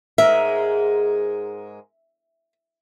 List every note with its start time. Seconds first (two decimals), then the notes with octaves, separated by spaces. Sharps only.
0.18 G#2 G#3 A#4 E5